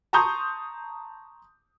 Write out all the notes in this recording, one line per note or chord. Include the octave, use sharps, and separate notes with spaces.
A5 A#5 C6 C#6 D#6 G6